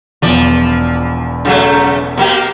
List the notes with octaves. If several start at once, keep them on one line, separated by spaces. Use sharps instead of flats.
E1 E2 F3 D5
C#3 F#3 A3
B2 A#3 G4